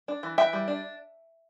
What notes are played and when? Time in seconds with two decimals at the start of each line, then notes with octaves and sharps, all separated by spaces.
0.08 D4
0.23 E3
0.38 E3 E5 G5
0.53 G3
0.68 D4